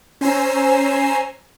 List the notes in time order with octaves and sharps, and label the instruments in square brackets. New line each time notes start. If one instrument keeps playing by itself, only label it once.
[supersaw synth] C#4 C5 G#5 A#5 E6 C7